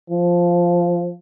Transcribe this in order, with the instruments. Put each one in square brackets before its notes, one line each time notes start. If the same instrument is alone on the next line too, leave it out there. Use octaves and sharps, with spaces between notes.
[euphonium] F3